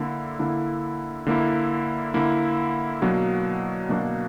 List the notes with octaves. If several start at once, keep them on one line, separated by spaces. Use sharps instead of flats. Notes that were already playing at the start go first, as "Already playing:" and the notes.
Already playing: D3 A#3 E4
D3 A#3 E4
D3 A#3 E4
D3 A#3 E4
B2 F#3 A#3 D4 F#4
B2 F#3 A#3 D4 F#4